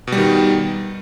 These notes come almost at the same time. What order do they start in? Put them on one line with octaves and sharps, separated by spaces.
B2 G3 D#3